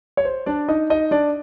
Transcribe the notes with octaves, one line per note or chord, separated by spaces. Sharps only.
C#5
C5
D4 D5
D#4 D#5
D#4 D#5
D4 D5